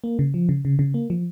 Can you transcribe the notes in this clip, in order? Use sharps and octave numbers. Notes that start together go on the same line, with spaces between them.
A#3
C#3
F3
C#3
C#3
C#3
A#3
F3